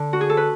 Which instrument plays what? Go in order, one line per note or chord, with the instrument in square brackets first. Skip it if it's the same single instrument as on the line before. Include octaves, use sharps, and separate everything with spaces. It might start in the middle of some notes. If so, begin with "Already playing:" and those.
Already playing: [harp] D3
F#4
G#4
A4
B4